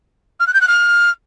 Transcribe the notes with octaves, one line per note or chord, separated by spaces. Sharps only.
F6
F#6
G6
F#6
F6